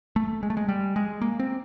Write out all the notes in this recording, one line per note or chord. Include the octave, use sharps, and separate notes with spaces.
A3
G#3
A3
G#3
G3
G#3
A#3
C4